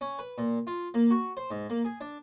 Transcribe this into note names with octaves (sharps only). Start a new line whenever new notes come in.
C#4
B4
A#2
F4
A#3
F#4
C5
G#2
A#3
G#4
D4